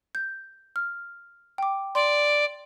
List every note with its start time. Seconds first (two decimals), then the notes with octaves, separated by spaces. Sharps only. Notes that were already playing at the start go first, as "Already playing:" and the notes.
0.15 G6
0.76 F6
1.58 G5 D6
1.95 D5 C6